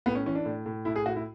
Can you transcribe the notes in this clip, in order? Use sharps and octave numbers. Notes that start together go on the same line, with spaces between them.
A2 B3
C#4
E3 C#4
D4
A2
A2
A2 E4
G#4
A2 F#4
E4